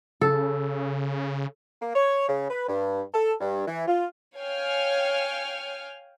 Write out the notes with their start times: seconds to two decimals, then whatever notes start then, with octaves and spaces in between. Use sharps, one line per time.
0.21 C#3 A4
1.82 A#3
1.96 C#5
2.29 C#3
2.50 B4
2.69 G2
3.14 A4
3.41 G2
3.68 E3
3.88 F4
4.36 C#5 F5 G5 G#5 F6